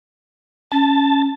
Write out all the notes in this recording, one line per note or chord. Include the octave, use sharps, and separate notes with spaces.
C#4 A5